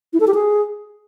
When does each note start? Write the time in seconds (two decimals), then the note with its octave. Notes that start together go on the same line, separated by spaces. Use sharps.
0.13 E4
0.20 A4
0.27 G4
0.34 G#4